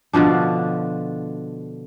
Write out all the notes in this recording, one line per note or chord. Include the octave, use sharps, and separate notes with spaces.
B2 D3 F3 D4